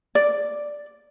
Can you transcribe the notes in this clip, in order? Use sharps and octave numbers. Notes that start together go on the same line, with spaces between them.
D5